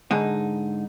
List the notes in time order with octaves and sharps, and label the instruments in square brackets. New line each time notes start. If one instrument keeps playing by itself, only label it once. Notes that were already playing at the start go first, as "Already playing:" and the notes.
[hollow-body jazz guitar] G#2 D3 D#4